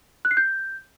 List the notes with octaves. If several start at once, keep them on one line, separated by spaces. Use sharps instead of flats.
F#6
C7
G6